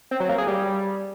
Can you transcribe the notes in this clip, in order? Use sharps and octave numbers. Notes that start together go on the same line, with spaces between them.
C4
F#3
A#3
G#4
G3